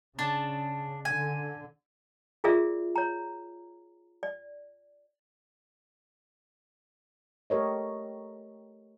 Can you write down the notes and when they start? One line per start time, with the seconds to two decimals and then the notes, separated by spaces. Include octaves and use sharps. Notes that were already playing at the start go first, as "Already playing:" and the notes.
0.19 C#3 D4 A5
1.05 D3 G#5
2.44 F4 F#4 G#4 A#4 D5 E5
2.96 C#5 A#5
4.23 D5
7.50 A3 G4 A#4 C#5 D#5